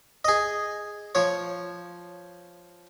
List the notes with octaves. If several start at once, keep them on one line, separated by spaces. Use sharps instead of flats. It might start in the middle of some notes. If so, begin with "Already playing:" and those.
G#4 D#5
F3 C#5